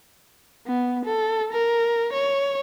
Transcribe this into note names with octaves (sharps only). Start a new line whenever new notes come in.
B3
A4
A#4
C#5